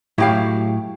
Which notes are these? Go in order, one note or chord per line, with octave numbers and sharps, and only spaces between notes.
A2 F#3 E4 F#4 G4 F5